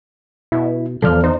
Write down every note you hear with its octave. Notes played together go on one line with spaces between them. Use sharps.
B2 E4
B1 E2 F3 A4 D5 F6
D#4 C5